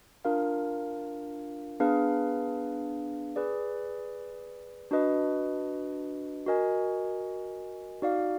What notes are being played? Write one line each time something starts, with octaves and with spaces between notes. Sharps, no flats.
D4 F4 A#4 F5
B3 D4 G#4 B4 F5
G#4 B4 D5
D4 F#4 B4 D#5
F#4 A#4 D#5 G#5
D#4 F#4 D5 F5